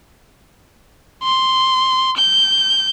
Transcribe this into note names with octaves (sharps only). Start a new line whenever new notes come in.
C6
G6